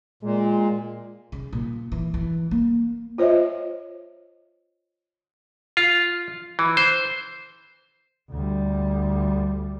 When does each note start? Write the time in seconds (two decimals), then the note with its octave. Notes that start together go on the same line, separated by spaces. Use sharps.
0.23 A#2 G#3
1.32 C#3
1.53 A#2
1.92 E3
2.14 E3
2.51 A#3
3.18 F4 C5 C#5 D#5 E5
5.77 F4
6.59 E3
6.77 C5
8.31 D2 G3